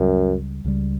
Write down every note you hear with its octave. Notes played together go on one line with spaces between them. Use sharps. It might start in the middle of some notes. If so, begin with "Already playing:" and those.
Already playing: C#2 F#2 C#3 G3
C#2 C#3 G3